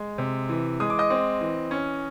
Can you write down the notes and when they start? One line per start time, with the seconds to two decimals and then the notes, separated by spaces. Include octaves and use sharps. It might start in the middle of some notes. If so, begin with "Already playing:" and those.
Already playing: G#3
0.18 C3
0.49 E3
0.80 G#3 D#6
0.90 D6
0.99 D#5 D#6
1.10 C4
1.41 E3
1.71 C#4